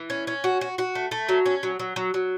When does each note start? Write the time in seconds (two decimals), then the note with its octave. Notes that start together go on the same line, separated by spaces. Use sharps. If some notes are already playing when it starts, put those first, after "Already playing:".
Already playing: E3
0.10 C#4
0.27 C#4
0.44 F#4
0.61 F#4
0.78 F#4
0.95 A3
1.11 A3
1.29 F#3
1.46 C#4
1.63 F#3
1.79 F#3
1.96 F#3
2.14 F#3